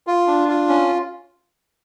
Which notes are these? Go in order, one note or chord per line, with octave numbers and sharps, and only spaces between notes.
F4
D4
F4
C#4